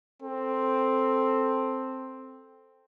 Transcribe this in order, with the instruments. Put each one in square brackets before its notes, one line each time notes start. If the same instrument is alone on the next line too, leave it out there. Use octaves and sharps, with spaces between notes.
[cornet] C4 [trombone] A4